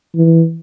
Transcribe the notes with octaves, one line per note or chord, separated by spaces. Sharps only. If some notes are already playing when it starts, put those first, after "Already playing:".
E3